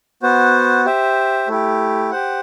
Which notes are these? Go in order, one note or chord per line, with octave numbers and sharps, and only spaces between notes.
B3 F#4 C5
G4 C5 E5
A3 E4 G4
G4 C5 F#5